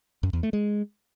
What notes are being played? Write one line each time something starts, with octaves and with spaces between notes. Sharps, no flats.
F#2
E2
A3
G#3